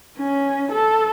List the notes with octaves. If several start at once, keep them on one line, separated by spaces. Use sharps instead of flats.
C#4
A4